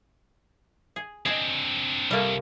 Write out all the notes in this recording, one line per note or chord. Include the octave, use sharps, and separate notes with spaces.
G#4
C4 D4 G#4 D#5
C2 G3 A3 A#3